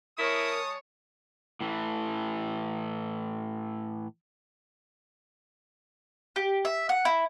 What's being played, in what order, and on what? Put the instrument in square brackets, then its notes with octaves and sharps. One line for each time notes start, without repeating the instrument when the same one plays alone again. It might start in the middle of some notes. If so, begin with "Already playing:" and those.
[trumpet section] G#3 A5 D#6 [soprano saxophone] E4 [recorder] A#4 [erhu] C#5
[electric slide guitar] A2 E3
[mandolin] G4
E5
F#5
E4